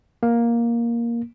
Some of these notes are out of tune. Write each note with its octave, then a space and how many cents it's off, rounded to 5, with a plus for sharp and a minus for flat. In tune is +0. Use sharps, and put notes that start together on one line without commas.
A#3 +5